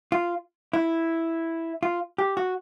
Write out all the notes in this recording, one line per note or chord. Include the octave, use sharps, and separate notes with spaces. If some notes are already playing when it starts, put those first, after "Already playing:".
F4
E4
F4
G4
F#4